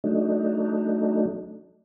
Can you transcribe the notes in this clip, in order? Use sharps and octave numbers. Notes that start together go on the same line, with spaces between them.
F#3 A3 D4 D#4